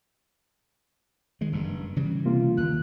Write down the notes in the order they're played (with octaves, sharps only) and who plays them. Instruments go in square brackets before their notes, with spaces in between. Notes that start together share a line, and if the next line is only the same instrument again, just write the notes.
[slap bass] D#3 G#3
F#1 G2
C#3 E3 G3
[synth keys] C3 A#3 F4
[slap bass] D#2 [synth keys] F#6